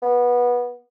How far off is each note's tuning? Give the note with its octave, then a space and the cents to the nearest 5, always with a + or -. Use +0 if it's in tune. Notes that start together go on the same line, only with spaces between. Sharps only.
B3 -20